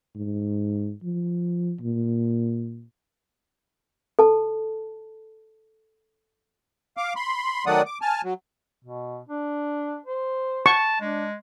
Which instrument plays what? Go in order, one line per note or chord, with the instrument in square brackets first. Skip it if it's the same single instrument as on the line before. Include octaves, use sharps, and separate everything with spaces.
[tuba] G#2
F3
A#2
[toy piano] A4 A5
[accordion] F5 D6
B5 C6
D#3 F#3 A3 D5 F#5 D#6
D6
G#5 A5 F6
F#3
[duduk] B2
D4
C5
[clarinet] A5 [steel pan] C#6
[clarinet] G#3 [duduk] D4